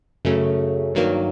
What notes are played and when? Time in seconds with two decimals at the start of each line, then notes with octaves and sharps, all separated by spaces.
0.25 F#2 C#3 F#3 A3 C#4
0.94 G2 D#3 F#3 A#3